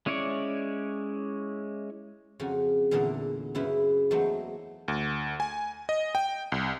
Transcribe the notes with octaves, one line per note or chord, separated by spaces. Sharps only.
G#3 C#4 E4 C#5 D5
F2 C#3 F#4 G#5
E2 A#2 D3 G#4 A#4 E5
F#2 C#3 E4 B4 C5
E2 F#3 A3 A#3 D#4 C5
D2
G#5
D#5
G5
C2